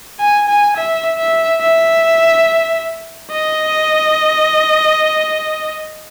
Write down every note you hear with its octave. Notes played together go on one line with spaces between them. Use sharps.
G#5
G#5
E5
E5
E5
D#5